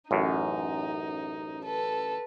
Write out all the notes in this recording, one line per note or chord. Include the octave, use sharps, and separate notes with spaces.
A1 F#2 D#4
A4 B4